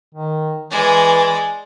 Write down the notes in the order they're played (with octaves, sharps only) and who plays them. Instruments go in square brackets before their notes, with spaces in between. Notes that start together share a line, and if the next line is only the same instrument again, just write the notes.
[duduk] D#3
[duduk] E3 [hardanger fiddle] G#3 D5